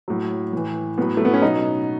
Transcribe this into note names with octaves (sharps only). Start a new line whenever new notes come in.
A2 F#3
A2 E3
A2 F#3 B3
A3
B3
C#4
B2 F#3 D#4